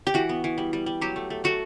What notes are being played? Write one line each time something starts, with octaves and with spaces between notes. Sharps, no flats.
G4
E3 F#4
B3
E3
G3
G3
G3
F#3 G4
A3
A3
A3 F#4 A4